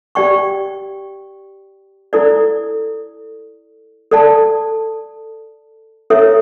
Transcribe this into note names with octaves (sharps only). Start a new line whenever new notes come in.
G4 D5 G5 C#6
E4 A4 D5
A4 D5 A5
E4 A4 C#5 E5